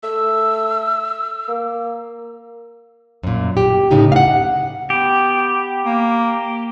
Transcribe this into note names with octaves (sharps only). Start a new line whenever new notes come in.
A3 E6
A#3
F#2 A#2
G4
A2 C#3 D#4 G4
F5 F#5
B3 G4
A#3